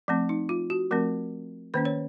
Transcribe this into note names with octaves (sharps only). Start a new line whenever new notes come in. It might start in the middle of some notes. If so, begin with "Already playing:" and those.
F3 A3 C4
D#4
F4
F#4
F3 A3 C4 A#4
D#3 A#3 C#4 C5
C#5